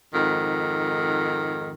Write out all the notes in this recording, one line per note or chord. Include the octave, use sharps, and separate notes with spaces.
F2 G#2 D#3